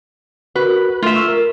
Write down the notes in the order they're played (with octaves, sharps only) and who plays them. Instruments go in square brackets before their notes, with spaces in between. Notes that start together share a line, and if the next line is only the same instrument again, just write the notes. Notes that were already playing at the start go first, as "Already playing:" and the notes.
[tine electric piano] F#4 A#4 [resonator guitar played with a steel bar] B4
[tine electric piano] A3 [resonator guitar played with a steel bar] F4 E5
[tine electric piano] C#6 E6 F6
A#4